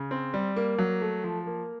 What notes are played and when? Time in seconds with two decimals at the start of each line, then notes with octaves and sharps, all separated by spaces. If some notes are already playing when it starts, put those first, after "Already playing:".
Already playing: C#3
0.11 C4
0.34 G3
0.56 A#3
0.79 F#3
1.01 A3
1.24 F3
1.47 A#3